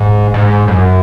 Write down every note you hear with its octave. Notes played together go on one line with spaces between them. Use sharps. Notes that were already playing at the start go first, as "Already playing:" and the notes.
Already playing: G#2
G#2
F#2